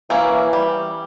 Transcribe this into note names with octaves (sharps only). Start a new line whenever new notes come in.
E3 A#3 C#4 E4
G3